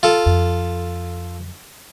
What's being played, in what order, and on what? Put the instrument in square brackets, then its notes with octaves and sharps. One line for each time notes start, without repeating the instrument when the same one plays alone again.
[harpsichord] F4 A4
[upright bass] F2